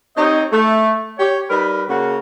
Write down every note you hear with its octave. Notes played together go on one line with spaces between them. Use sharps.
C4 D#4 G4 C#5 D#5
A3
G4 C#5
G3 D#4 A#4 B4
C#3 A#3 F#4